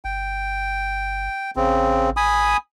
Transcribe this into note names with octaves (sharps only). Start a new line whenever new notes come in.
G1 G5
A1 C#3 C4
G#5 B5 D#6